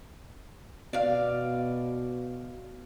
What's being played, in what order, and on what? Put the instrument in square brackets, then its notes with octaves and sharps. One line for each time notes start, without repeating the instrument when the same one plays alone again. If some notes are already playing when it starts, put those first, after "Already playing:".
[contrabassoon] B2 [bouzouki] D5 F5